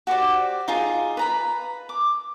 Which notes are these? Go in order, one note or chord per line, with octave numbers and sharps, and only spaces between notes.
F#4 G4 C5 D5
D#4 F4 G#4
B4 A#5 B5
D6